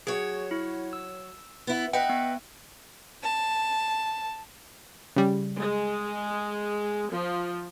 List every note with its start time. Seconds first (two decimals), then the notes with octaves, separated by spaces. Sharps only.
0.07 F#3 G#4 C#5
0.51 E4
0.93 E6
1.67 B3 E4
1.93 B4 D#5 E5 F#5 G5
2.09 B3
3.23 A5
5.16 C#3 G3
5.60 G#3
7.13 F3